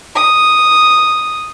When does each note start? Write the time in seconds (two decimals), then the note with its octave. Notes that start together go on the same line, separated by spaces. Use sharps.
0.16 D#6